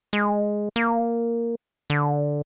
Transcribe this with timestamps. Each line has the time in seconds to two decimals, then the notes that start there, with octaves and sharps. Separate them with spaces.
0.13 G#3
0.76 A#3
1.90 D3